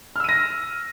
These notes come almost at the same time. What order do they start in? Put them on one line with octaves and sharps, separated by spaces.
F6 E6 D#7 A#6